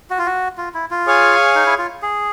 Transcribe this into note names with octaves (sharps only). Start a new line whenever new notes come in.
F#4
F4
F#4
F4
E4
F4
G#4 C#5 F5 G#5
D#4
E4
F4
G#4